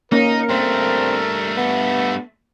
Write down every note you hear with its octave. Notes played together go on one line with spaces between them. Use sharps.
A#3 C#4 D#4 A#4
G2 A3 C4
B3